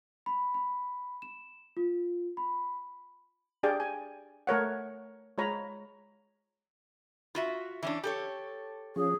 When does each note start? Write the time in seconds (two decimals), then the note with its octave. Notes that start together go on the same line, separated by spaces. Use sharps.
0.26 B5
0.54 B5
1.22 E7
1.77 F4
2.37 B5
3.63 D4 G4 G#4 D5 G5
3.80 G#5
4.47 A3 A#4 C#5 F#5
5.38 G#3 F4 C#5 A#5 B5
7.35 F4 F#4 E5
7.83 E3 C#4 D4
8.04 G4 A4 C#5
8.96 F3 C#4 G#4